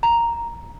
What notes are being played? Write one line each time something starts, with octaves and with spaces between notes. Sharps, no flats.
A#5